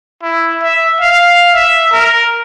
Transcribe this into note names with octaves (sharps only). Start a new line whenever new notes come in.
E4
E5
F5
E5
A#4